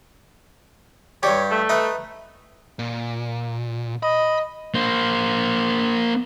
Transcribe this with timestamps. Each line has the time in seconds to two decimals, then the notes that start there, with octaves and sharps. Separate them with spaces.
1.23 G2 G4 C#5 D5 D6 G#6
1.50 A3
1.69 D#4 B4 E5
2.79 A#2
4.03 D#5 B5
4.75 A#3 C5